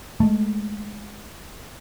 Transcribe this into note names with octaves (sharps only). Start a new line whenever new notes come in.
G#3 A3